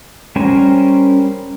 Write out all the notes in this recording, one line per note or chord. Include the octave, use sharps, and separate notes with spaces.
G3 C#4 A#4 C5 G#5